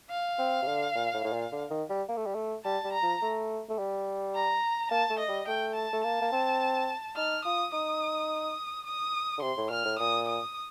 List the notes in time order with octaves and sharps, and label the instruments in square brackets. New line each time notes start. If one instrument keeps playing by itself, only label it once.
[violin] F5
[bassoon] C4
C3
D3
A#2
A2
A2
A#2
D3
D#3
G3
A#3
A3
G3
A3
[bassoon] G3 [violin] A5
[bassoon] G3
[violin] A#5
[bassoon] F3
A3
A3
G3
[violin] A#5
[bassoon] A#3 [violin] A5
[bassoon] A3
[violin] D#5
[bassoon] G3
[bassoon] A3 [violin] G5
[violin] A5
[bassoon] A3
[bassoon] A#3 [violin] A5
[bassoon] A#3
C4
[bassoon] D#4 [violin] F6
[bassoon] F4 [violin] D#6
[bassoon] D#4 [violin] D#6
[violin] D#6
[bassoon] D3
[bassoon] C3 [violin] C6
[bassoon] A2
[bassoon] A#2 [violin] F6
[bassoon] A2
[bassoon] A#2 [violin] D#6
[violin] D#6